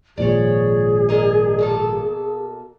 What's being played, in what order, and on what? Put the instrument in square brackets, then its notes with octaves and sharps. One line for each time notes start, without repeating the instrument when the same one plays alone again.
[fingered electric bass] G#1 A#2 F3 [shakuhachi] G#4 [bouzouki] C#5 D5
[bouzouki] D4 A#4 D#5
B2 A#3 A4